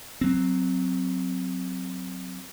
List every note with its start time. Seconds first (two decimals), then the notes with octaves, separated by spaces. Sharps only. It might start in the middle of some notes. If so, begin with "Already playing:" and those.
0.21 F#3 C4